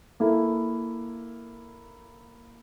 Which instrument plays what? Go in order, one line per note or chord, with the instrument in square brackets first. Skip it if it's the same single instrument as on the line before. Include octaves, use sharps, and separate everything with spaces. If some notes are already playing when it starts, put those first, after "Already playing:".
[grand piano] A#3 E4 A4